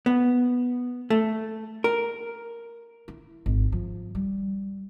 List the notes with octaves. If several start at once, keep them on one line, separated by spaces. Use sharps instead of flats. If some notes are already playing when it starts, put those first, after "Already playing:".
B3
A3
A#4
E4
G#1
F3
G3